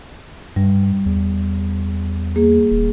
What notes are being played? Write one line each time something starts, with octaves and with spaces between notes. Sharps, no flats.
G2 G3
E2
A#3 G#4
D#1